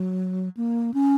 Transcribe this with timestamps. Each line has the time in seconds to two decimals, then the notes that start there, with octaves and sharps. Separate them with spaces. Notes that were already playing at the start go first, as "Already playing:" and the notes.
Already playing: F#3
0.57 A#3
0.94 C#4